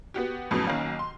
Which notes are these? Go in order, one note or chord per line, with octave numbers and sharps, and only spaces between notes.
B3 F#4 G4
F2 A2 C#3 F#3 B3
B1 D#3 A#3 C#4
C6